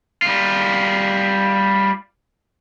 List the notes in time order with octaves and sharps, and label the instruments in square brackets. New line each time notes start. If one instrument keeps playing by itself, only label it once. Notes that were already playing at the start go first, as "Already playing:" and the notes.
[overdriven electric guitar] G3 F4